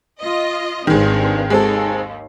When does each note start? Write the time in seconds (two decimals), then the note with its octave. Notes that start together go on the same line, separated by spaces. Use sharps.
0.20 F4 D#5
0.87 G#1 G2 D#3 G#3 C4
1.50 D#2 G#3 C4 A4